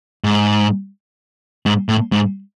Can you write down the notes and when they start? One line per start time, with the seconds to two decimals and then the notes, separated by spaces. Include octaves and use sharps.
0.24 G#2
1.66 G#2
1.89 A2
2.12 G#2